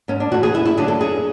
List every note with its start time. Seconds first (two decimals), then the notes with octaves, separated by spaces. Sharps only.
0.08 G#2 C#4
0.20 D4
0.32 E3 A3 F#4
0.43 G#4
0.54 F#2 E4
0.66 E4
0.77 D3 F#3 A3 G#4
0.88 A4
1.01 F#2 G#4